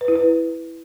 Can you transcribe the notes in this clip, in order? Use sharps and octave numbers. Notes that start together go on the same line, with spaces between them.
B4
E4
B4